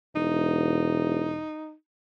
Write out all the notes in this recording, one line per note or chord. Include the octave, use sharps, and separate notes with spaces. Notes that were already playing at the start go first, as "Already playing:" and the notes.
E1 D#4